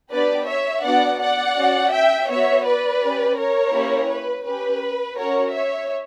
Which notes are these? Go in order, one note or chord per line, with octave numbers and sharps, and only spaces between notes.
B3 D4 G4 B4 D5
C#5 E5
B3 D4 F#4 D5 F#5
D5 F#5
C#4 F#4
E5 G5
B3 F#4 C#5 E5
B4 D5
C#4 G4
A#4 C#5
A#3 C#4 E4 G4
B4
C#4 G4 B4
C#4 F#4 A#4 C#5
C#5 E5